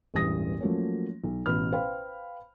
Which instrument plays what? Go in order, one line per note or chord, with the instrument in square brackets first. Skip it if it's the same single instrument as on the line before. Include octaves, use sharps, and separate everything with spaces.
[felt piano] E1 A1 G2 E3 D#6 A#6
F3 F#3 A3 A#3 C#4
B1
A1 B2 B4 B5 F6
B4 C5 F5 G5 B5